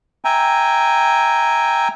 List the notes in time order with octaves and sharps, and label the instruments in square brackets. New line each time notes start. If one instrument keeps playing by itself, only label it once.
[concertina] E5 G5 G#5 A#5